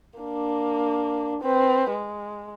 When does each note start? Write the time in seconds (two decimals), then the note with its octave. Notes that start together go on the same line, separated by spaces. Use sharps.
0.19 A#3 D4
1.41 C4 B4
1.90 G#3